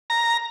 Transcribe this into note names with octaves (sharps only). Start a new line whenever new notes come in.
A#5